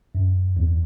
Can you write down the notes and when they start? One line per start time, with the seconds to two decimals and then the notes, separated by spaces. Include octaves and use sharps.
0.15 F#2
0.57 E2